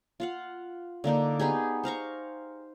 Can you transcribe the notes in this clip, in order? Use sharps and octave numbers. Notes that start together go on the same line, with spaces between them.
F4 F5 F#5
D3 A#3 D4 D#4
B3 D#4 G4 G#4
C5 F5 A#5 C#6